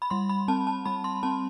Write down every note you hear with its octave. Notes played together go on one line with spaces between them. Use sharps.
B5
G3 C6
B5
C4 A5
A5
G3 B5
C6
C4 A5